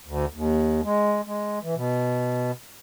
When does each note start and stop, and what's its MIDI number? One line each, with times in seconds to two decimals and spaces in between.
0.07 0.25 38
0.34 0.81 39
0.84 1.21 56
1.26 1.59 56
1.63 1.75 52
1.76 2.51 47